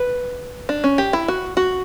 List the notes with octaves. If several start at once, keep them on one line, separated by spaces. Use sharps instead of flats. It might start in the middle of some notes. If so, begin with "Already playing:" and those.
Already playing: B4
D4
C#4
G4
E4
F#4
F#4